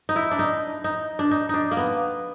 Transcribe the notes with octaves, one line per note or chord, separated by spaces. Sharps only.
D#4
E4
D4
D#4
D#4
D4
D#4
D4 D#4
A#3
B3